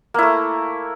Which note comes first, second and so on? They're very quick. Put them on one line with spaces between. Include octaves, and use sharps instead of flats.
A#3 E4 A3